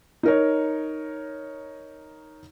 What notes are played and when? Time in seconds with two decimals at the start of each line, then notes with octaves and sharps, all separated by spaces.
0.23 D#4 A#4 C#5